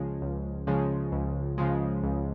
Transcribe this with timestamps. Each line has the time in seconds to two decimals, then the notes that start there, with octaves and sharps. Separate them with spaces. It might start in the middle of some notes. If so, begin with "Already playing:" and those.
Already playing: C#2 C#3 F3 G#3
0.22 C#2
0.67 C#3 F3 G#3
1.12 C#2
1.58 C#3 F3 G#3
2.03 C#2